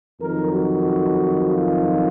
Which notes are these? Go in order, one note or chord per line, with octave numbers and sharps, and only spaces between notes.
F2 D#3 F#3 A#4
F#4
F4